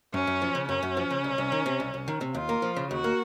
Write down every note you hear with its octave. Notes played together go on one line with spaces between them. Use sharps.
F#2 C#4
F#2
F3
C#3
F#2 C#4
F#2
F3
C#3
C2
C2
D#3
C3
C2
C2
D#3
C3
D#2 F4
A#3
F3
C#3
D#2 F#4
A#3